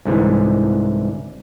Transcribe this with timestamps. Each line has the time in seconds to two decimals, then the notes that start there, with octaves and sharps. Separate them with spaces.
0.05 C2 G#2 D3 E3 G#3